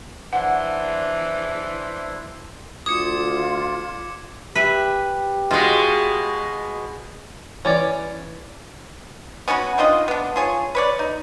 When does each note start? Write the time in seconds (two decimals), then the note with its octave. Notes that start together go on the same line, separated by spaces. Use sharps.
0.33 E3 D4 E4 C5 F#5
2.86 D2 F4 D6 D#6 G#6 C#7
4.55 G4 B4 E5 G#5
5.51 B2 G#3 F4 G#4
7.65 E3 C#4 C#5 D5
9.48 B3 C#4 F#4 B4
9.78 D#3 D4 F4 D#5
10.08 B3 D4
10.36 F4 G#4 C#5
10.75 B4 C#5 D5
10.99 D#4